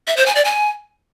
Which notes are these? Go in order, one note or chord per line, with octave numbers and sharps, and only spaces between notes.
E5
C5
G#5
D5
G#5